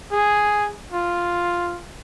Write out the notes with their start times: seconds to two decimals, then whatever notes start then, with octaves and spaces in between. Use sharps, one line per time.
0.11 G#4
0.91 F4